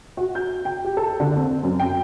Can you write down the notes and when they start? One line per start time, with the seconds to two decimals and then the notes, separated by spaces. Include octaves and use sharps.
0.17 F#4
0.35 G6
0.65 G5
0.84 G4
0.97 A4
1.20 D3
1.37 C4
1.63 F#2
1.80 G5